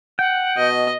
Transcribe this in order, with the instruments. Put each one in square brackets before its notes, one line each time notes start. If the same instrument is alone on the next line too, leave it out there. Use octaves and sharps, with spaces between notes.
[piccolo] F#5 [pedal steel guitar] G5
[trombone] B2 [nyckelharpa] D#5